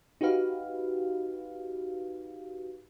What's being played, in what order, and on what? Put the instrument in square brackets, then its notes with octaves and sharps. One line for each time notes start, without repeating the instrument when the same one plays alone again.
[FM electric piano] D#4 F#4 G4 B4 F5